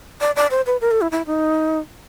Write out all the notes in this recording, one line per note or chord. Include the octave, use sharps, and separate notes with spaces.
D5
D5
C5
B4
A#4
A4
E4
E4
D#4